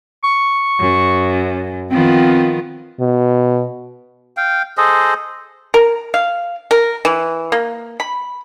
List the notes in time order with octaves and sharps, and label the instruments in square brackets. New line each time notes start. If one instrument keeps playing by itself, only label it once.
[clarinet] C#6
[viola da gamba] F#2
[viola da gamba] D#3 F3 B3 [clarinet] C4
[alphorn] B2
[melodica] F5 G5
G#4 A4 C5 D#5
[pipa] A#4
F5
A#4
E3
A#3
B5